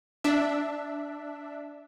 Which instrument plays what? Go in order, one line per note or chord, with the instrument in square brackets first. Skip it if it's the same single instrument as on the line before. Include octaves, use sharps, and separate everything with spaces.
[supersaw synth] D4 E5